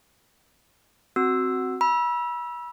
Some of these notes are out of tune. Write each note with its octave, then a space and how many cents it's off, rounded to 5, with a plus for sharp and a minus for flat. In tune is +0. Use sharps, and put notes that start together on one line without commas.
C4 +0 F#4 +0 E6 +0
B5 -35 E6 +0